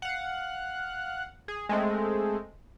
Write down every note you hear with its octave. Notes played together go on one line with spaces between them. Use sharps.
F5 F#5
G#4
G#3 A3 C4